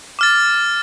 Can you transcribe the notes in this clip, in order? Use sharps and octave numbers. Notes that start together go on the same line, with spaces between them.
D6 F6 A6